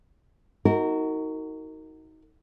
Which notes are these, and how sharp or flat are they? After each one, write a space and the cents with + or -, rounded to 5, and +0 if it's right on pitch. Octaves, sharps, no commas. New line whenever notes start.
D#4 +25 F#4 +10 A#4 -20